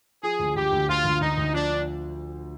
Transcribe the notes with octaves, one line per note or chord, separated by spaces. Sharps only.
F3 G#4
D2
D2 G4
D2
D2 F4
D2
D2 D#4
D2
F3 D4